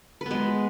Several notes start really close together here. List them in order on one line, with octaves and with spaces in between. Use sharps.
B4 B3 G#3